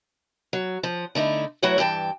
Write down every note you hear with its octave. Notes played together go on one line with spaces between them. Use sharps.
F#3
F3
D3 A3 D#4 E4
F#3 A3 E4 F#4 B4 C#5
G2 E3 G5 A5